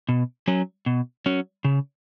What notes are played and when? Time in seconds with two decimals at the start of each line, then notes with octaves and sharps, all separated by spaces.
0.09 B2
0.48 F#3 C#4
0.86 B2
1.26 F#3 C#4
1.65 C#3